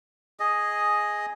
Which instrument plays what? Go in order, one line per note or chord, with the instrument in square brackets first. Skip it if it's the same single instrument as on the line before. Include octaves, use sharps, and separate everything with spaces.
[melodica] G#4 D#5